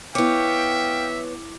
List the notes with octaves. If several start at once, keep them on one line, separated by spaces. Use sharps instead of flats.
B3 E4 C#5 E5 F5 G5 D6